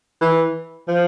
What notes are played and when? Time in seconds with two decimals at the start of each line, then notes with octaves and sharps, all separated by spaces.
0.21 E3
0.88 F3